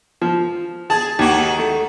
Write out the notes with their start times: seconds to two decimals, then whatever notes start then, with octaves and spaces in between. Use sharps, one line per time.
0.22 F3
0.90 G#4 A5
1.19 D#2 D#3 F#4
1.59 A3